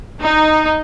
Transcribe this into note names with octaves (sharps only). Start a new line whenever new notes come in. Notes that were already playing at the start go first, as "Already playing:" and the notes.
D#4